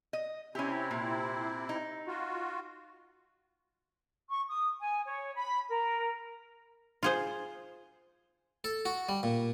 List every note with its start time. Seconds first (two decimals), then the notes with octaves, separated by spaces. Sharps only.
0.13 D#5
0.55 C3 C4 C#4 E4 G4
0.91 A#2
1.69 D#4
2.07 F4 F#4
4.28 C#6
4.48 D#6
4.80 G#5
5.04 C#5
5.35 B5
5.68 A#4
7.03 F4 G#4 C5
8.64 A4
8.85 F#4
9.09 G3
9.23 A#2